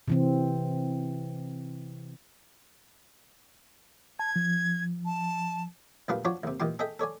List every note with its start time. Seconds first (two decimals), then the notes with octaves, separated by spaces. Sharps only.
0.08 C3 E3 C4
4.19 A5 G#6
4.36 F3
5.05 A5
6.08 D2 A#2 G3 D4 B4 F5
6.25 F3 D4 F4 F#4 C#5 D5
6.43 D#2 C3
6.60 A#2 D#3 E3 G4 C6
6.79 G#4 A4 D#5 E5 G5
6.99 A4 C#5 D5 G#5